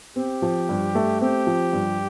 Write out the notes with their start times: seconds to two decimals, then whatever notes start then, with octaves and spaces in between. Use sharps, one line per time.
0.16 C4 G4
0.42 F3
0.69 G2
0.95 A3
1.20 C4 G4
1.47 F3
1.73 G2